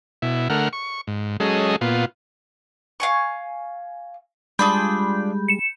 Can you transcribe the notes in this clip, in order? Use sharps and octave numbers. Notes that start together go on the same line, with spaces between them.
B2 E4
D3 A3 A#4 F#5 F6
C#6
G#2
F#3 G#3 C#4 G#4 A4 D#5
A#2 B3 F4
F5 G#5 C#6
G3 G#3 D4 F4 G#4 B5 G6
C#7 E7